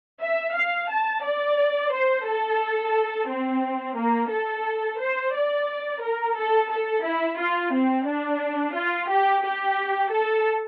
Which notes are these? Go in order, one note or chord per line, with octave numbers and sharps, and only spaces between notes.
E5
F5
A5
D5
C5
A4
C4
A#3
A4
C5
D5
A#4
A4
A4
E4
F4
C4
D4
F4
G4
G4
A4